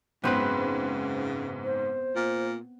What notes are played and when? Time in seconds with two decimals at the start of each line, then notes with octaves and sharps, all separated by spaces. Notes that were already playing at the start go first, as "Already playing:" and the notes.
0.24 F#1 G#2 C#3 B3 C4 B4 F#6
1.64 C5
2.15 A#2